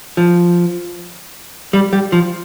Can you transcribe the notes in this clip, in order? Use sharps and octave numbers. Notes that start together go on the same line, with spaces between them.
F3
G3
G3
F3